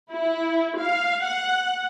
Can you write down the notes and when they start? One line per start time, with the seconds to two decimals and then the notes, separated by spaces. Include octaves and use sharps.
0.11 E4
0.79 F5
1.24 F#5